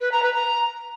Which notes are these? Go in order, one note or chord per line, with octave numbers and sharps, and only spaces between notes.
B4
A#5
B4
A#5